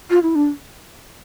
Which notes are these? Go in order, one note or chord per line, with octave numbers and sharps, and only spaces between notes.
F4
E4
D4